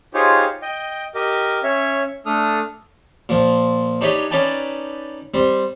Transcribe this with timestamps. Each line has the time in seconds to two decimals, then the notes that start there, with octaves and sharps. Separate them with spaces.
0.14 D#4 F4 G4 G#4 C5 C#5
0.62 D#5 G5
1.15 G4 A#4 D#5
1.63 C#4 C#5 E5
2.26 A3 D4 A4 D#6 F6
3.29 A#2 F3
4.01 D4 D#4 G4 C#5 D#5 B5
4.30 C#4 D#4 B4 D5 G5 A5
5.34 G3 C4